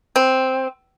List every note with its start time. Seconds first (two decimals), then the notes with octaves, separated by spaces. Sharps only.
0.16 C4